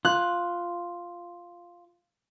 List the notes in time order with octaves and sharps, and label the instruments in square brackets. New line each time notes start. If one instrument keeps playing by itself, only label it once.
[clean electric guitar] F4 [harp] F#6